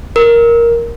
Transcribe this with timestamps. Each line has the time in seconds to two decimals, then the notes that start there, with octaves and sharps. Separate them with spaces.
0.16 A#4